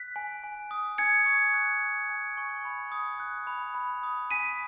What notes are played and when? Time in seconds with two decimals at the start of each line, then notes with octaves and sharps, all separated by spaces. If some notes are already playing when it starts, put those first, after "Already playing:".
Already playing: F#6 B6
0.16 G#5
0.44 G#5
0.71 D#6
0.98 G#5 G#6 C#7
1.26 C#6
1.54 F#6
1.81 G#5
2.09 G#5
2.37 C#6
2.65 B5
2.92 D#6
3.20 F#6
3.47 B5
3.75 B5
4.03 D#6
4.31 G#5 B6 D#7